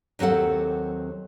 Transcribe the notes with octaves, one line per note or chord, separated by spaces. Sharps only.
D#2 F#3 C4 A4 F#5